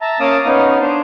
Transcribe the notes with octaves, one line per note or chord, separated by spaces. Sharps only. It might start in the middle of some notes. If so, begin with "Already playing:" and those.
E5 A5 A#5
A#3 C#4 F5 A5 D6 D#6
B3 C#4 D#4 F5
D4 C5